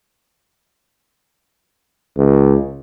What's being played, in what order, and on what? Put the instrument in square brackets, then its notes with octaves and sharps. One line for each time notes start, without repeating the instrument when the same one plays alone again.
[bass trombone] C#2